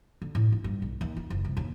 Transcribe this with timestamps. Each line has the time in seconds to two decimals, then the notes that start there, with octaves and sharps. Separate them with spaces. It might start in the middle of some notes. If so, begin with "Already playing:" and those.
0.22 D3
0.35 A2
0.52 D#4
0.64 G2
0.82 B1
1.01 D#2
1.17 F4
1.30 F#1
1.45 C2
1.57 D#2